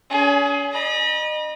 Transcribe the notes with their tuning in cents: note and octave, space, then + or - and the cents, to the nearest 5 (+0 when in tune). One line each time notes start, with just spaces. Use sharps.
C#4 +45 G#4 +20
D#5 -30 B5 -45